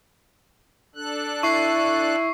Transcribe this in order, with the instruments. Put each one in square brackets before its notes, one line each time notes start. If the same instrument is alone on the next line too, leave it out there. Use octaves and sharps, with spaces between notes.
[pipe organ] D4 A4 F#6
[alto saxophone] E4 [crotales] C#6 C7